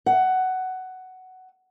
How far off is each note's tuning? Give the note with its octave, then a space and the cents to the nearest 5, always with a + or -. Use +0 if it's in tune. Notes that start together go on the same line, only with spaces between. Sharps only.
F#5 +10